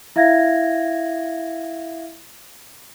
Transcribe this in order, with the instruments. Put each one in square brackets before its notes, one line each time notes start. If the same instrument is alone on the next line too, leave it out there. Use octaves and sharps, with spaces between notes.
[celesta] E4 E5 F5 G#6 A#6